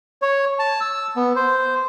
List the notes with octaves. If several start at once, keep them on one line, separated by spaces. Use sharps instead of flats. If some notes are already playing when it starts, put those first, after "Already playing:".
C#5
A5
E6
B3
C5